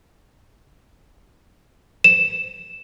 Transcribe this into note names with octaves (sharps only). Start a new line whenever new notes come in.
E7